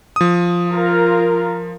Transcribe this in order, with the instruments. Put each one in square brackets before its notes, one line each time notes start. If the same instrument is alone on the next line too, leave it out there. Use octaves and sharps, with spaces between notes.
[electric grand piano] F3 D#6
[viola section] F4 A#4